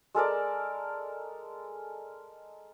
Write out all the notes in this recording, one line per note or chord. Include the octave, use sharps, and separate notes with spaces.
G#3 A4 A#4 D5